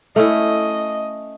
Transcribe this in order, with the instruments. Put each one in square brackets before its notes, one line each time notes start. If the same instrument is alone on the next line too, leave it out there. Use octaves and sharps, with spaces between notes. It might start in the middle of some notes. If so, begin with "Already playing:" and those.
[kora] A3 C#4 E4 [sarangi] D#5